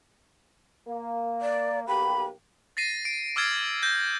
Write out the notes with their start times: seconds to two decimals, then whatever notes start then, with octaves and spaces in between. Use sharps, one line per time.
0.87 A#3
1.42 D5
1.87 B1 A#3 G4 B5
2.77 A6 A#6 C7 D#7
3.05 D7
3.36 D6 E6 F6 G#6 A6 C7
3.82 G6 A#6